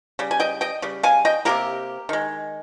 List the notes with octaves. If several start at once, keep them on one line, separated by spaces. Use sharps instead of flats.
C#3 G3
G#5
D#5 G5
D#5 G5
C#3 G3
F5 G#5
D#5 G5
C3 F3 A#3 G4 A#4
D#3 G#3